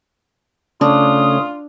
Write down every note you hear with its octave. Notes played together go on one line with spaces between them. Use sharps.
C#3 A3 C#4 D4 F4 D#6